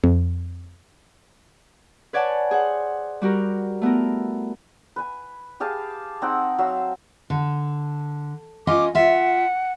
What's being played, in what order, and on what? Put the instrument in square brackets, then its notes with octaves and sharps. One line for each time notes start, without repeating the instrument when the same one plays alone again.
[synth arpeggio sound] F2
[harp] B4 C#5 D5 F#5 G#5 A5
G#4 C5 F#5
G3 F#4 G4 A#4
A3 B3 E4 A#4
[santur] B4 G#5
G4 G#4 F5 A5
C4 D#4 F#5 G5
F#3 E5 F5 E6
[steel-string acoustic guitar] D3
[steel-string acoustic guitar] C#4 F4 D#5 [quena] D6
[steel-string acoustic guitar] F4 E5 [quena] F#5